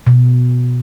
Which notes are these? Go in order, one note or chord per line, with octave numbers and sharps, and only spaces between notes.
B2